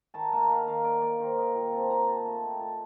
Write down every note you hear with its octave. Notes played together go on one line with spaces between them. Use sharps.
D#3 A5
A#3 A5
D#3 F5
D#3 F5
A#3 D5
A#3 D5
D#3 C5
A#3 D#5
A#2 G5
C4 A5
A#2 A#5
D#4 A5
A3 A5
D#4 G5
A#2 A5